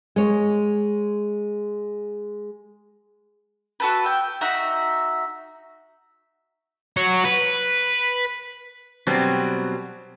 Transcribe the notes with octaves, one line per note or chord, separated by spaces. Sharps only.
G#3 C#5
F#4 A4 B4
G5
D#4 F#4 E5 F#5
F#4 C#5
B4
B2 F#3 G3 B3 C4